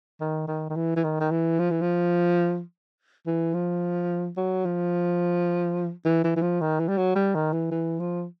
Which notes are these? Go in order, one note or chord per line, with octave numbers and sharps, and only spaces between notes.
D#3
D#3
D#3
E3
E3
D#3
D#3
E3
F3
E3
F3
E3
F3
F#3
F3
E3
E3
E3
F3
D#3
E3
G3
F#3
G3
D#3
E3
E3
F3